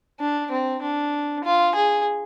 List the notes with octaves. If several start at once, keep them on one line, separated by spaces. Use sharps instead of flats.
D4
C4
D4
F4
G#4